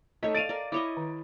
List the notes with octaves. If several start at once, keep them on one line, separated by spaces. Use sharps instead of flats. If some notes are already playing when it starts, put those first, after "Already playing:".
A3 D#4 A4 C#5 D#5
D5 F5 A6 D7 D#7
A#4 D5
E4 C#5 D#5 D6
D#3